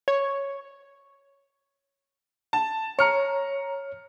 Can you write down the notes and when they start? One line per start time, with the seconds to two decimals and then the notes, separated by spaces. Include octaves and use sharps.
0.08 C#5
2.53 A5
2.99 C#5 A#5 F6 C#7